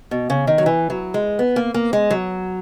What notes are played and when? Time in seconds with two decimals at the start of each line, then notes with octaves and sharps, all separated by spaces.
0.11 B2
0.30 C#3
0.47 D#3
0.58 F#3
0.66 E3
0.90 F#3
1.14 G#3
1.39 B3
1.56 A#3
1.74 A#3
1.93 G#3
2.11 F#3